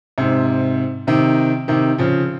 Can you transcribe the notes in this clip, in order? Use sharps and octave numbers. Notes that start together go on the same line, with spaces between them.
G#2 C3
C3 D#3
C3 D#3
C#3 F3